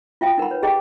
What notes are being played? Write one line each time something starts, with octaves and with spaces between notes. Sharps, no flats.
F4 F#4 E5 F5 G5
D#4 A#4 F#5 B5
B4 C#5
G4 G#4 D#5 G5 B5 D6